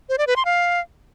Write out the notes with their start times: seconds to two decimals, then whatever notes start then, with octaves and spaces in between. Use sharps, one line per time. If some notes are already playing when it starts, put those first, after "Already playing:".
0.09 C5
0.18 D5
0.27 B4
0.36 C6
0.45 F5